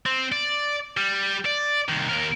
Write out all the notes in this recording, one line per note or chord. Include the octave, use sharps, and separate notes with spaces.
C4
D5
G3
D5
C2 D#3
D#2 A#4